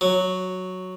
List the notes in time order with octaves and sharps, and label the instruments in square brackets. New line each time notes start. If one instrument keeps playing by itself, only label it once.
[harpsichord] F#3